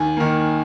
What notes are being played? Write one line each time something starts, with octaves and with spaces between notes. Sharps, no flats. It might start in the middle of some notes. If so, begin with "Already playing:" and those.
Already playing: D#2 G#5
D#3 A#3